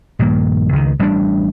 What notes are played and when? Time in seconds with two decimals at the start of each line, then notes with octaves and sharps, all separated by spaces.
0.19 A#1 G2 D#3 A#3
0.73 C#2 D#3
0.99 A1 G3 G#3 D4